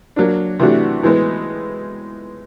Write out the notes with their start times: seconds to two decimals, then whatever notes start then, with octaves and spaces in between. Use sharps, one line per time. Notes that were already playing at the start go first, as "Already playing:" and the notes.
0.16 F#3 A#3 D4
0.59 C3 E3 A3 D4 F#4
1.03 A2 E3 G#3 B3